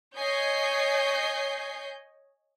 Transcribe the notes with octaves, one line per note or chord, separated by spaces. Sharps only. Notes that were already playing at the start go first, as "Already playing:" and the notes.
C#5 D#5 G#5 G6 C7